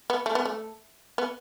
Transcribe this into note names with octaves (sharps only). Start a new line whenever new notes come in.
B3
A3
B3
A3
B3